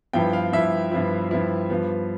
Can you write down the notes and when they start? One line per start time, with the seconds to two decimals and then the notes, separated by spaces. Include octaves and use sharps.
0.13 G2 F3 B3 E4 G5
0.33 F5
0.52 G2 F3 B3 E4 E5
0.92 G2 F3 B3 E4
1.31 G2 F3 B3 E4
1.70 G2 F3 B3